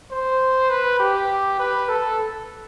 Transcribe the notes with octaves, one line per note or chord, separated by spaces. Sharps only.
C5
B4
G4
B4
A4